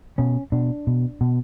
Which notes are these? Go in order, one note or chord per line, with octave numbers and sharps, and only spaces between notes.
B2 C#4
B2 D4
B2
B2